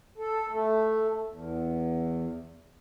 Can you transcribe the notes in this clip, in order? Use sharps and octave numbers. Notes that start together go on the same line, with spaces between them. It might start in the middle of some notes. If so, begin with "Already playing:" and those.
A4
A3
E2